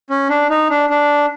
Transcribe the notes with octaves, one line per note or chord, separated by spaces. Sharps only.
C#4
D4
D#4
D4
D4